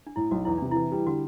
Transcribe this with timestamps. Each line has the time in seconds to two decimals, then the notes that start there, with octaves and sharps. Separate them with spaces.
0.07 D4
0.16 A2 E4
0.31 B1 F#4
0.45 E2 E4
0.58 C3 D4
0.71 E3 E4
0.92 G3
1.07 D3 F#4